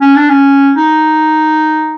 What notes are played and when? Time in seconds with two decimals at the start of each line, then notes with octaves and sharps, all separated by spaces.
0.01 C#4
0.16 D4
0.29 C#4
0.76 D#4